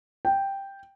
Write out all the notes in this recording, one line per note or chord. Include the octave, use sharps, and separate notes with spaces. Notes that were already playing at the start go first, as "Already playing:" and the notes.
G5